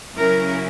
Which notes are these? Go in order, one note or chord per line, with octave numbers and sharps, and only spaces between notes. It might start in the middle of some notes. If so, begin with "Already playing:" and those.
C#3 F#3 C#4 E4 A#4